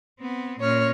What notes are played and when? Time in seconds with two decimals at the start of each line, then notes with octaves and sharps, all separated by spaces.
0.20 B3 C4
0.60 A#2 C#4 C#5 F6